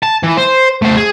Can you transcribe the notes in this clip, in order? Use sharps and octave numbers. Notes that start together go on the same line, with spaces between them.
A5
E3
C5
A3 C5
G#4